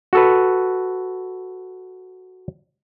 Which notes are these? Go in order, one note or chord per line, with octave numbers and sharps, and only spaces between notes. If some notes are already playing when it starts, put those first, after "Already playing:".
F#4 A4 B4